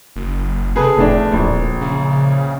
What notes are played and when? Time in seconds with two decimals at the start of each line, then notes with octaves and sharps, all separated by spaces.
0.16 F#1
0.76 C3 G#4 A4 B4
0.97 F1 A2 D4
1.32 D1 A#1
1.81 C#3